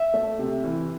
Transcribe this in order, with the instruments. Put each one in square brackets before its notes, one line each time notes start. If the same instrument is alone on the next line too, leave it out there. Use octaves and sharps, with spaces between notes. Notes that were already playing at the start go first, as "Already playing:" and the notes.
Already playing: [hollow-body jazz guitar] E5
[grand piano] A3
C3
E3